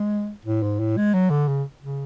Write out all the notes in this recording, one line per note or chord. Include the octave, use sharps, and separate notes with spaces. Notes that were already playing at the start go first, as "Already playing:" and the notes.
Already playing: G#3
A2
G#2
A2
G#3
F#3
D3
C#3
C#3